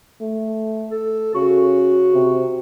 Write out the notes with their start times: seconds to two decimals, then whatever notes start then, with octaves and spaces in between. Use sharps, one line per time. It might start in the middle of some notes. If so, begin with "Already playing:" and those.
0.21 A3
0.91 A4
1.35 C#3 F#4
2.14 C3